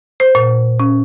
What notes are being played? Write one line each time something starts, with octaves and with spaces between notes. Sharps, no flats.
C5
A#2
C#4